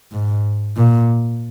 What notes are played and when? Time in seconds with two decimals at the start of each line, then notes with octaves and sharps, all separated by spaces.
0.12 G#2
0.77 A#2